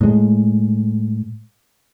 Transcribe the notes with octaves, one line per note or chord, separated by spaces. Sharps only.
A2 G#3